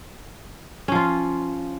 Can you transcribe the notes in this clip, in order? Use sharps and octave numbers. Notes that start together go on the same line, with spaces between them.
F3 C#4 F4